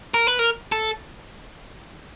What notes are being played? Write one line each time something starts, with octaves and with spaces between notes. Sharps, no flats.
A#4
B4
A#4
A4